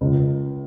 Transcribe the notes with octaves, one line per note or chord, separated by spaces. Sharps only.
C#2